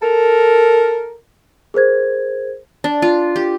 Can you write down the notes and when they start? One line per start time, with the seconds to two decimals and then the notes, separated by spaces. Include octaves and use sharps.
0.03 A4 A#4
1.74 G#4 A#4 C5 G#6
2.84 D4
3.02 F4
3.36 G4